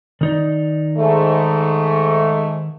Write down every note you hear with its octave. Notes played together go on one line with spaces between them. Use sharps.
D#3 D#4 D5
G#2 A3